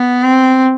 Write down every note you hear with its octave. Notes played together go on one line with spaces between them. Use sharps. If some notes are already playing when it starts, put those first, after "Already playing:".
Already playing: B3
C4